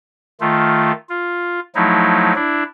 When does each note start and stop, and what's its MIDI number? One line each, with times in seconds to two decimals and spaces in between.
0.41 0.92 51
0.41 0.92 57
0.41 0.92 65
1.09 1.60 65
1.75 2.33 53
1.75 2.33 54
1.75 2.33 57
1.75 2.33 63
1.75 2.33 64
2.35 2.63 62
2.35 2.63 64